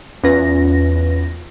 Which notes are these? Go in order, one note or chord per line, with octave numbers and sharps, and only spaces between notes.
E2 C#4 F4 B4 A#6